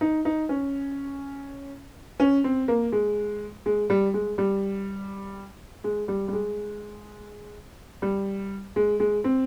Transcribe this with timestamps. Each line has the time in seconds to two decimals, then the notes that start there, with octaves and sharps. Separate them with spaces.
0.01 D#4
0.25 D#4
0.49 C#4
2.20 C#4
2.44 C4
2.68 A#3
2.92 G#3
3.66 G#3
3.90 G3
4.14 G#3
4.38 G3
5.84 G#3
6.08 G3
6.28 G3
6.33 G#3
8.02 G3
8.76 G#3
9.00 G#3
9.24 C4